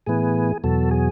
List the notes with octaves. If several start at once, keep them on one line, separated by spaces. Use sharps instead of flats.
A2 E3 B3 G#4
E2 B2 F#3 A4
G#4